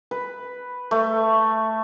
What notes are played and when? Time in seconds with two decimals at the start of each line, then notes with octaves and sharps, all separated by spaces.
0.11 B4
0.91 A3